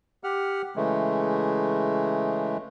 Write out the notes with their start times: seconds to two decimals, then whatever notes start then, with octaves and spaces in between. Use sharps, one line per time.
0.24 G4 F#5 F6
0.76 C#3 E3 G#3 A3